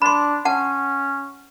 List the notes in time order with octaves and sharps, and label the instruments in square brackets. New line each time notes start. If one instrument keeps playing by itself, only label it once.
[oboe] D4 [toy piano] B5 C6
[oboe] C#4 [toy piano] F#5 A5